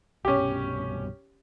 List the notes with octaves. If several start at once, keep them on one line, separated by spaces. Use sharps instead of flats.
C2 G2 B2 C#4 G4